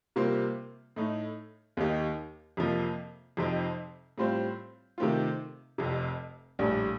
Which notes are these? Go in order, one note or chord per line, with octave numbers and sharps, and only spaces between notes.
C3 G3 A#3 F4 C5
A2 A3 D#4
D#2 D#3 A#3 D#4 G4
F2 C3 F3 A#3
F2 C3 F3 C4 D#4
A2 G3 C4 F4 C5
C3 D#3 A3 C4 F4
F1 F2 C3
A#1 A2 G3 D4